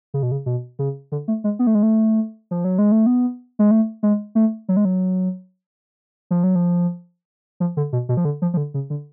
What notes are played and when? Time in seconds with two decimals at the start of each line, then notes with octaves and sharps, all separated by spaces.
0.14 C#3
0.23 B2
0.31 C#3
0.46 B2
0.79 C#3
1.12 D3
1.28 A3
1.44 G#3
1.59 B3
1.67 A3
1.75 G#3
1.83 A3
2.51 F3
2.64 F#3
2.78 G#3
2.92 A3
3.06 B3
3.59 G#3
3.71 A3
4.03 G#3
4.35 A3
4.69 F#3
4.77 G#3
4.85 F#3
6.31 F3
6.44 F#3
6.55 F3
7.60 F3
7.77 D3
7.93 B2
8.09 B2
8.17 F3
8.25 D3
8.42 F3
8.54 F3
8.57 D3
8.74 C#3
8.90 D3